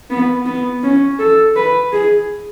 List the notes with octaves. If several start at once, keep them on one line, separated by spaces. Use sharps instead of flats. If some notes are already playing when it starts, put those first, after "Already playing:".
B3
B3
C#4
A4
B4
G#4